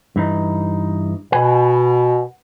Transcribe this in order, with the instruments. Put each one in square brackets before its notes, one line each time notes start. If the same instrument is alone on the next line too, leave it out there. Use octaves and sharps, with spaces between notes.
[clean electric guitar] G2 E3 D#4
[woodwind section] B2 [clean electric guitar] B4 F#5 G#5